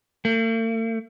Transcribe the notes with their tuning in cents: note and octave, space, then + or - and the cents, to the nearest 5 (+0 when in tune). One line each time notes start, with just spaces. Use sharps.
A3 +45